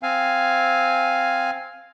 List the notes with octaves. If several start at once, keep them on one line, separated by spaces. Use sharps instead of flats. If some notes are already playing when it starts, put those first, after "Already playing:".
C4 F5 G#5